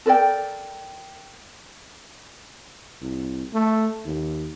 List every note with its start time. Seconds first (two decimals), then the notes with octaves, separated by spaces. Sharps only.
0.06 A4 A#4 D5 G5
3.01 C2
3.53 A3
4.05 D#2